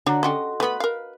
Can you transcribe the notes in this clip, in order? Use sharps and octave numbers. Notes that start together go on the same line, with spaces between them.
D3 D4 F#4 C#5 F#5 A#5
C#4 F#4 G4 A4 D#5 F#5 C6
A3 B3 B4 B5
A#4 F5